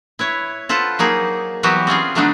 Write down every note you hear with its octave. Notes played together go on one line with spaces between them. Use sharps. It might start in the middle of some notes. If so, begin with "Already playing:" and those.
E4 B4 C#5
F4 A4 B4 C5 F#5
F#3 A#3 D#4 G#4
E3 F#3 G3 B3 F#4 G4
C4 C#4 F4 G#4
D3 F#3 A3 B3 D4 D#4